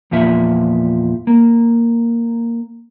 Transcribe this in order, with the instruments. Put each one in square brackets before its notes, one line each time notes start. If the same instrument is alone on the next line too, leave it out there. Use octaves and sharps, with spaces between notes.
[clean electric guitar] E2 A#2 F3 E5
A#3